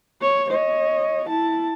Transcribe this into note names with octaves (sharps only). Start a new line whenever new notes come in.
C#5
C#5 D#5
E4 A5